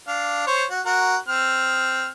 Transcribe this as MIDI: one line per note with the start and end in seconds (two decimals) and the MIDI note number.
0.08 0.43 62
0.08 0.43 77
0.47 0.64 72
0.47 0.64 73
0.70 0.80 66
0.85 1.16 66
0.85 1.16 70
1.28 2.10 60
1.28 2.10 89